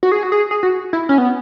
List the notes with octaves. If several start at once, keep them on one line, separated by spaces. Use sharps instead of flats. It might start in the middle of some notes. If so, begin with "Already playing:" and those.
F#4
G#4
F#4
G#4
G#4
F#4
E4
C#4
B3